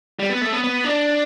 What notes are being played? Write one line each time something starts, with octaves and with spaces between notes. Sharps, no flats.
G3
B3
A3
B3
B3
D4